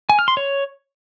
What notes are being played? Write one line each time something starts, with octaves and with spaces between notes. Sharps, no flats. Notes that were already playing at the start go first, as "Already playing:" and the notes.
G#5
F6
C6
C#5